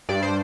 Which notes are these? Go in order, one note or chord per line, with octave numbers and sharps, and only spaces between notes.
G2 D5
C5